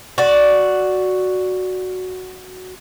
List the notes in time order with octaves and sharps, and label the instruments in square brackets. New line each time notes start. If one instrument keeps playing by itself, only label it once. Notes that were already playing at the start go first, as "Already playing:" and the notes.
[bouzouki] F#4 D5